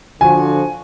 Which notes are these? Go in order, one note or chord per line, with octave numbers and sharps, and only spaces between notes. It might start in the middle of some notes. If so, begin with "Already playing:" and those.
D3 F3 F#4 G#5